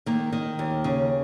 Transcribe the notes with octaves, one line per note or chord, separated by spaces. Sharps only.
D#3 A#3
D#3
D#2
C#3